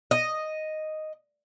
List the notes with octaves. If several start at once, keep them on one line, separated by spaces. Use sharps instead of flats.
D#5